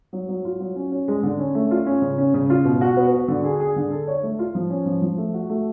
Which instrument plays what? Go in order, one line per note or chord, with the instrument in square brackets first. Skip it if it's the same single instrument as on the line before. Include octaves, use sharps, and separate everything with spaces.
[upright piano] F#3
F#3
F4
F#3
C#4
C#4
G#3
D3
C#4
A3
F4
C#4
C#3
C#4
C#3
F4
B2
F#4
B3
F#4
D3
G#4
G#4
D3
A4
C#5
A3
F4
F3
C#4
F3
F3
A3
F#4
A3